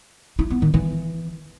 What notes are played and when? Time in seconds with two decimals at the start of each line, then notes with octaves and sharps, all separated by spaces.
0.39 E4
0.50 B3
0.62 D#3
0.74 E3